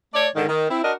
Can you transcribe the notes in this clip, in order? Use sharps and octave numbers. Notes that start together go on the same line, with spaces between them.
A3 C#5 D5
G#2 D3 D#3
D#3
C4 E4
D4 F#4 A#4 D5 D#5